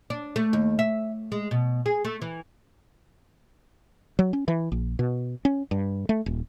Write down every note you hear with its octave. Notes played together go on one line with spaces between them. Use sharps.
D4
A3
D#2
E5
G#3
B2
G#4
A3
E3
F#3
C#4
E3
A#1
B2
C#4
G2
A3
D#1